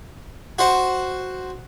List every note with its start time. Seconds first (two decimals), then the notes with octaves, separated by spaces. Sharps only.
0.59 F#4 C5